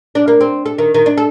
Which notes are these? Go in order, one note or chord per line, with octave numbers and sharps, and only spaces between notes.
D4
A#3
C4
A4
D#3
D#3
D4
A4